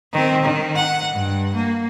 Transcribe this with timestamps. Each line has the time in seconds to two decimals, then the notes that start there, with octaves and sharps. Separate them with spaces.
0.13 D#3 C4
0.43 D#3
0.75 F#5
1.11 G2
1.54 A#3